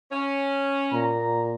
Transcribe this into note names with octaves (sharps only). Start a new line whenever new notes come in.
C#4
A#2 A#5